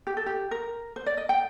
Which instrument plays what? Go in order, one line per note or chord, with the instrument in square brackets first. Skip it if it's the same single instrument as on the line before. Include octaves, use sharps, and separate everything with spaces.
[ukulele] G4
A4
G4
A#4
C5
D5
D#5
G5